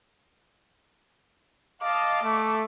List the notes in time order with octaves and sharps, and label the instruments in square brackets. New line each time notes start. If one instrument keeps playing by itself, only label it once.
[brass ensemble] D#5 F5 A5 [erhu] D6
[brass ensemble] A3